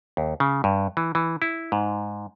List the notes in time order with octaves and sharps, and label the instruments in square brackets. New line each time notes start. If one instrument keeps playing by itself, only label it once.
[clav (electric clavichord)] D#2
C#3
G2
E3
E3
E4
G#2